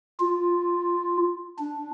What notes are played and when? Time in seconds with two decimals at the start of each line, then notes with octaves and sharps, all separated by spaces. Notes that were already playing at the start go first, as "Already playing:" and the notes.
0.20 F4
1.59 D4